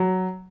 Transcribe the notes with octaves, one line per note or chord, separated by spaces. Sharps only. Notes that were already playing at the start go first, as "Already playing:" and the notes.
Already playing: F#3